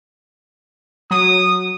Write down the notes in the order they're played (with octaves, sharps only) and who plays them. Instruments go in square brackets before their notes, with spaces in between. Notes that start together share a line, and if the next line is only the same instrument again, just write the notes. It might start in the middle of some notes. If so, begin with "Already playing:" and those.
[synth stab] F#3 [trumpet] D#6